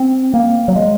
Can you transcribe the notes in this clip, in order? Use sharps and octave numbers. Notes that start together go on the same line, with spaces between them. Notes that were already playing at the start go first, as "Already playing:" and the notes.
Already playing: C4
A#3
F#3
G#3